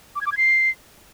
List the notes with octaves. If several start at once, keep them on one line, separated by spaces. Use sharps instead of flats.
D6
G#6
D6
G#6
C7